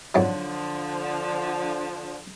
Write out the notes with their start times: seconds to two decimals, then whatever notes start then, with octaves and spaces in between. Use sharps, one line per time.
0.15 F2 G#2 D3 F3 F#3